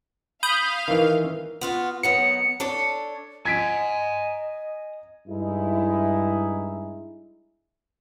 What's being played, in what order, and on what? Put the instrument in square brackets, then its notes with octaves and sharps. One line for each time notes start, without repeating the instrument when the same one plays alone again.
[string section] F5 [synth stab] B5 D#6 G6
[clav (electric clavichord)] D#3 E3 [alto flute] A#4
[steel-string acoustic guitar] B3 F4 F#4
[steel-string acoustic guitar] D#3 F#3 B3 [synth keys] C#7
[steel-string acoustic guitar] D4 A4 C#5
[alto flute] D#5 [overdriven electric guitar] G#5 A#5 [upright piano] G#6 B6 D7
[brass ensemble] G2 G#3 D#4 E4